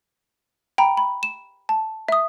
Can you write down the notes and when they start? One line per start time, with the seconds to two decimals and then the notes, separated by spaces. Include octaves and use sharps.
0.78 G5 A#5 B5
0.97 B5
1.23 E7
1.69 A5
2.09 E5 D#6